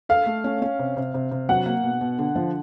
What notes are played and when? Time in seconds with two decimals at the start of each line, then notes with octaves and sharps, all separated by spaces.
0.09 A4 F5
0.26 A3
0.44 C#4
0.62 C#4
0.79 C3
0.97 C3
1.14 C3
1.31 C3
1.49 F#3 F#5
1.66 A#3
1.83 B2
2.01 B2
2.19 D3
2.36 F3